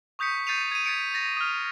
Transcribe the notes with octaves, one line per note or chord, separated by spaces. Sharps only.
C#6 D#6 G6 B6 C#7
G6 A6 C7 C#7 D#7 F7
G#6 D#7
G#6 A6 B6 C#7 D7 F7
A6 A#6 F7
D#6 F6